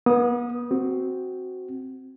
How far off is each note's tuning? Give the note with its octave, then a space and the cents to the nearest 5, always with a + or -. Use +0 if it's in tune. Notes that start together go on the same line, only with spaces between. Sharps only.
B3 -35 D#6 +0
C4 +5 F#4 +5